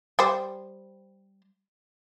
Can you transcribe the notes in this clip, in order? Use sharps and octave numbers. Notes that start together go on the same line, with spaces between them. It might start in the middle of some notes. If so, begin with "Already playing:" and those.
G3 C5